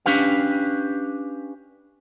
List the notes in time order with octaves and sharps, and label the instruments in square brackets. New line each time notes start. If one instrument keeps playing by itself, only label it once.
[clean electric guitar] C#4 D4 G4 B4 F5